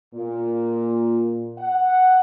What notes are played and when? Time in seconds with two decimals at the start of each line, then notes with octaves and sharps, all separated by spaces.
0.15 A#2
1.58 F#5